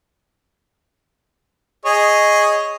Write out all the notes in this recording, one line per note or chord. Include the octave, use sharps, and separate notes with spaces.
G#4 C#5 D#5